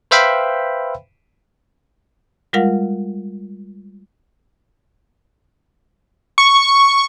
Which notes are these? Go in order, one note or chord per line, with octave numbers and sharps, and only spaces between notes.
B4 C5 E5 F5 G5 B5
G3 G#3 F4 A#4 F5 F#5
C#6